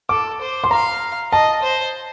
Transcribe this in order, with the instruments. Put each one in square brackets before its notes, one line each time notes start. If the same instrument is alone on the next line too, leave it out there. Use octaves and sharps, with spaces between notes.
[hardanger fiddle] A4 [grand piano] D6
[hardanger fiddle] C5
[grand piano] C6
[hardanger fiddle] F5 [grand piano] A#5
[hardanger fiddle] D#5 [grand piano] A5
[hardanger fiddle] C5